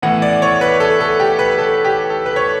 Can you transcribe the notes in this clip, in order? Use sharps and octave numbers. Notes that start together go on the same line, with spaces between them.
A2 E3 B3 F#5
D5
C#5
B4
A4
A4
G4
B4
A4
G4
A4
B4
C#5